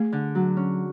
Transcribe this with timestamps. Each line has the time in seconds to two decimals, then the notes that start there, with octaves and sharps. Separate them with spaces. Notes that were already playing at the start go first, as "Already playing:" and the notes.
Already playing: A3 G#4
0.12 D3
0.35 F#3
0.57 C#4